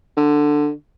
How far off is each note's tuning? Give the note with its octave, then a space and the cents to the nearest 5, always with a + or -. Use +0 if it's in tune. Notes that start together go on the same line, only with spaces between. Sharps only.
D3 +10